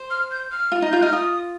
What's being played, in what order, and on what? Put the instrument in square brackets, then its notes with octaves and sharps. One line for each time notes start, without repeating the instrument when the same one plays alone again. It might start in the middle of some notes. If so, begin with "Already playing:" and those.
Already playing: [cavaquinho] C5
[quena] F6
G6
F6
[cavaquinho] F4
D#4
[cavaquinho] F4 [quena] G6
[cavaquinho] D#4 [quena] F6
[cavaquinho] F4 [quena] D#6